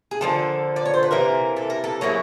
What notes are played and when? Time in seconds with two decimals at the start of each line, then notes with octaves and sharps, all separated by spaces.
0.11 G#4
0.21 D3 F3 A#3 A4
0.76 D5
0.86 C#5
0.94 C5
1.03 B4
1.11 C3 E3 A#3 A#4
1.56 A4
1.70 A#4
1.84 A4
2.01 F#3 A#3 C#4 E4 G#4